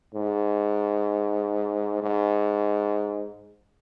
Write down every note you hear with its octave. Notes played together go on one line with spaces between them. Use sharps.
G#2
G#2